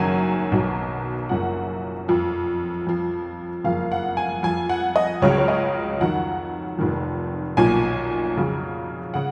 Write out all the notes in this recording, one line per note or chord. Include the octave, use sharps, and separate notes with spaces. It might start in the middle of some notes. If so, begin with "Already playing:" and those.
Already playing: F#1 F#2 D#3 F#3 G#5
B1 B2 F#3
F#1 F#2 F3 F#5
F2 F3
F2 F3
F#1 F2 F3 F5
F#5
G#5
F2 F3 G#5
F#5
D#5
C#2 C#3 F#3 C#5
C#5
D#5
F2 D#3 F#3 F#5
F1 F2 D#3
B1 A#2 F3 G#5
F2 C#3 F#3
C#3 F#5